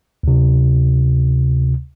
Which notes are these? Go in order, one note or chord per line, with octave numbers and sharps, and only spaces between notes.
D2 C3